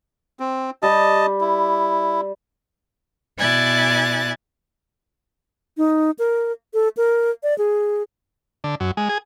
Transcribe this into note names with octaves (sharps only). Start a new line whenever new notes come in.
C4
G3 D#5 A5
E4
B2 E4 D5 G#5 F#6 A6
D#4
A#4
A4
A#4
D5
G#4
D3
F#2
G#3
G#4